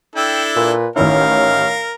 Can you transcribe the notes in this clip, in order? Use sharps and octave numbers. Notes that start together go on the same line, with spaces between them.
D4 E4 A4 G5
A#2 B4
A1 D#3 C#4 E4 A#4 F5